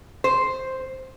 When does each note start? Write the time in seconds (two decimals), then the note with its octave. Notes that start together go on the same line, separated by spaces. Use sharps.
0.24 C5